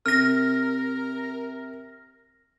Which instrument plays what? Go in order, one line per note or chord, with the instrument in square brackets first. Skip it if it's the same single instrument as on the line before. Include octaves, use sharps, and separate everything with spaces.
[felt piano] C3 [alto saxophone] A#4 [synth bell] F6 A#6